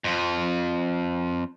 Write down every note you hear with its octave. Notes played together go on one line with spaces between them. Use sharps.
F2 F3